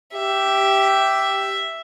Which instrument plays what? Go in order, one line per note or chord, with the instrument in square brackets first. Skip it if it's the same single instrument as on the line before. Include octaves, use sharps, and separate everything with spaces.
[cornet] G4 [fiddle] E5